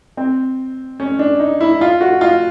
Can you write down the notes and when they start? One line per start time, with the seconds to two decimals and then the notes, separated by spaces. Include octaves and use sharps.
0.17 C4
1.00 C#4
1.19 D4
1.39 D#4
1.60 E4
1.81 F4
2.01 F#4
2.21 F4